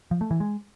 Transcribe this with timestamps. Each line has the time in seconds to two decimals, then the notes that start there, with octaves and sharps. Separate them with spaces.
0.11 F3
0.21 A3
0.31 E3
0.40 G#3